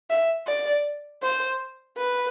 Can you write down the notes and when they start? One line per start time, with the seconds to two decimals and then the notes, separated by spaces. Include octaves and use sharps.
0.10 E5
0.47 D5
1.22 C5
1.97 B4